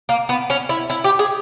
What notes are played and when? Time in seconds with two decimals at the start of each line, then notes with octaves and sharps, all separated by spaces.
0.09 A#3
0.29 B3
0.50 C#4
0.69 E4
0.90 E4
1.04 G4
1.19 G#4